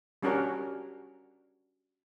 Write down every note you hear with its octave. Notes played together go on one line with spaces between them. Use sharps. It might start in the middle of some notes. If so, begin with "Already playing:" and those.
G3 C#4 D4 F#4 A#4 C#5